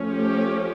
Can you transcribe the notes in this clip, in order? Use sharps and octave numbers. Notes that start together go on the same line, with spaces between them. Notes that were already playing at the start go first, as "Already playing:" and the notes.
Already playing: F3 A3 C#4
G4